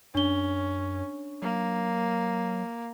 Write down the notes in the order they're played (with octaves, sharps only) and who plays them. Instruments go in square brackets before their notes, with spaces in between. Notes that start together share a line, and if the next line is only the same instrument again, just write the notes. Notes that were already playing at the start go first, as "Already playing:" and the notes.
[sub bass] F#2 [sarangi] C#4 [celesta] D4 G7
[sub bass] F#3 [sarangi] A#3